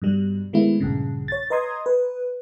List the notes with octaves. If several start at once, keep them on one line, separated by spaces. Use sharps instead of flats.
G2 B2 G3
D#3 G#3 A3 B3 E4
A#1 G2 C#3
C#5 A6
B4 D#5 A#5 C6 D#6 G#6
B4